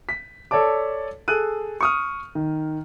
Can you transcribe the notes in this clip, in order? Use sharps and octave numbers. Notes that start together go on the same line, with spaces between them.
B6
A4 C#5 D5 A5 D6
G#4 A4 F#6 D#7
C#6 D#6 F6
D#3